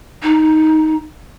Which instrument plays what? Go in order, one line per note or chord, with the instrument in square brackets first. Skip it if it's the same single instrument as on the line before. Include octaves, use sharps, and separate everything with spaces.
[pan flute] D#4